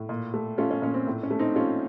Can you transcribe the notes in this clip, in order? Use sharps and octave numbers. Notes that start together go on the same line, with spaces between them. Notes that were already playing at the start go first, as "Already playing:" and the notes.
Already playing: A2
A#2
A3
A3 C#4 F4
C#4
A#2 C#4
C4
A2
C#4
A3
C4 D#4
A3 C#4 F4